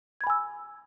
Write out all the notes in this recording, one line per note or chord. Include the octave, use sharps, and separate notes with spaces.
G#5 B5 E6 G#6